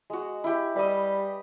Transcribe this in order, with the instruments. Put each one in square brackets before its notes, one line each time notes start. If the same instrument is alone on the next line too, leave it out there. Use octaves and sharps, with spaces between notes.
[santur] G#3 F#4
E4 G4
[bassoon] G3 [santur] B4 D#5